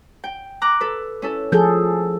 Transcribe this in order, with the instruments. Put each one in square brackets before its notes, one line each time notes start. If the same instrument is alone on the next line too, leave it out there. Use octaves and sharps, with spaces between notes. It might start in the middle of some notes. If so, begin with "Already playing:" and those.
[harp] G5
A#5 D6 F#6
A4 B4
C#4 E4 A4
[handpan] F3 G#4 A4 [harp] G6